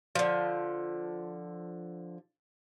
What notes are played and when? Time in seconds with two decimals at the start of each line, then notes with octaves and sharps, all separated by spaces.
0.15 D3 F3